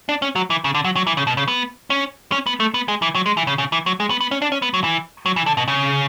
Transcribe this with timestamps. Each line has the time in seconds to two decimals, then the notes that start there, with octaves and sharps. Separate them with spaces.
0.09 D4
0.22 C#4
0.35 F#3
0.50 E3
0.64 C#3
0.75 D3
0.84 F#3
0.96 F#3
1.07 E3
1.17 C#3
1.27 B2
1.37 C#3
1.48 B3
1.90 C#4
2.32 C#4
2.46 B3
2.60 A3
2.74 B3
2.88 G#3
3.02 E3
3.15 F#3
3.26 G#3
3.37 E3
3.47 C#3
3.58 C#3
3.72 E3
3.86 F#3
4.00 G#3
4.10 B3
4.21 B3
4.31 C#4
4.42 D4
4.52 C#4
4.62 B3
4.74 F#3
4.84 E3
5.26 F#3
5.36 E3
5.46 D3
5.57 B2
5.68 C#3